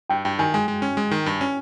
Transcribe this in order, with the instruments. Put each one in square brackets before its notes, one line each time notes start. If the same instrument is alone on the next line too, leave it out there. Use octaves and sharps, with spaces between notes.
[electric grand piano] G2 [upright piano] G5
[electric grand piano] G2 [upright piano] G5
[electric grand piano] D#3 [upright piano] G#5
[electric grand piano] G#3 [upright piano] G#5
[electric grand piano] G#3
C#4
G#3
D#3
G2
C#4